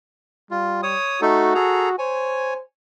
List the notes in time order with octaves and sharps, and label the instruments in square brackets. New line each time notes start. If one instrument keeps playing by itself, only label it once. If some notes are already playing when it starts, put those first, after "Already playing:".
[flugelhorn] G3 [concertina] F4
[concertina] C#5 D#6
[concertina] A3 D#4 A4 [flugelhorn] F#4
[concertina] G#4 A4 A#5
[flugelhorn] C5 [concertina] C#5 G#5